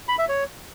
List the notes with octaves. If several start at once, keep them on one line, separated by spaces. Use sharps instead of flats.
B5
E5
C#5